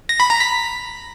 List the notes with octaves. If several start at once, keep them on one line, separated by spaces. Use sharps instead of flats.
A#6
B5
A#5
B6